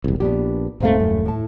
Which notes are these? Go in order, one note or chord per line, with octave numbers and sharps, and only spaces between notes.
E1 C2
A#1 B3 D4 G4
D#1 D#2 G#2 A3 C4 F5
F#2
A2 A5